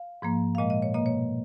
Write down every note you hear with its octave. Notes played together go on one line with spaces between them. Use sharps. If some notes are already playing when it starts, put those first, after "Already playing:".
Already playing: F5
G#2 F3 A#3
F5
A#2 G#3 D#5
D#5
C#5
B2 A#3 D#5
C#5